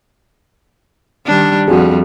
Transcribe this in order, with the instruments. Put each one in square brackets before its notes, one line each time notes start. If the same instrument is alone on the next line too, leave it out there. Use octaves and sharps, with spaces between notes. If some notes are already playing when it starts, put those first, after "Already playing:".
[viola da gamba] D#3 G3 D4
[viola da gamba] F2 G3 [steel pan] F#4 G#4